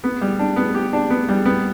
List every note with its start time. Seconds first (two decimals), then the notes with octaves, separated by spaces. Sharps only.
0.04 B3
0.21 G3
0.39 D4
0.56 B3
0.75 G4
0.93 D4
1.10 B3
1.29 G3
1.45 B3